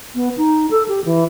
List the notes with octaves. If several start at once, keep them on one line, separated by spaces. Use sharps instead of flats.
B3
D#4
A4
G4
E3